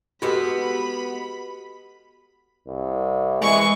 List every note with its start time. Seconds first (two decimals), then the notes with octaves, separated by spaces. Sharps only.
0.22 G#3 B3 F#4 G4 A4 F5 B5
2.67 C2
3.42 E3 G#3 C#6